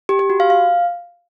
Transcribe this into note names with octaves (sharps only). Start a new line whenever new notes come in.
G4
G4
F#4
F5
F5